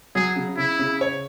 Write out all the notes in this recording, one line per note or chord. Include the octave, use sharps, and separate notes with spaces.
F#3 G#4
C#3
C#3 E4
C#3
C#5